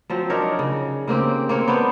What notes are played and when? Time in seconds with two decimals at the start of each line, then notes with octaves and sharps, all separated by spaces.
0.10 F3 F#3 C4
0.30 D4 D#4 A#4 C#5
0.59 C#3
1.08 C#3 A#3 C4 G4
1.49 A#3 C4 C#5
1.68 B3 D4 C5 C#5